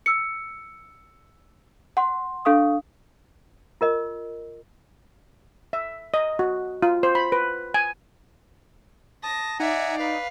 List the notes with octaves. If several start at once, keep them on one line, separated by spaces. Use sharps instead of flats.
E6 C#7
F#5 C6
D4 A4 F5 C#6 D#6
F4 A#4 D#5
E5
D#5
F#4
F4
C5
B5
B4
G#5
A5 D#6 A#6
D#4 D5 E5 F#5 G#5 A#5
B4 F5